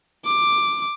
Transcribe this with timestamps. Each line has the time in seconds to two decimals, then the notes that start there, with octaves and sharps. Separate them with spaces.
0.25 D6